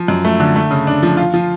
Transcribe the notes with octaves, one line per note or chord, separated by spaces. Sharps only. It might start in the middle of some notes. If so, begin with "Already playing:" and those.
Already playing: F3
F#2
A3
D3
A3
C#3
D4
F3
F4
F3